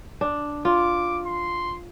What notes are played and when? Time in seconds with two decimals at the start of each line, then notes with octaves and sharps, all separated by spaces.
0.21 D4
0.65 F4 D6
1.25 C6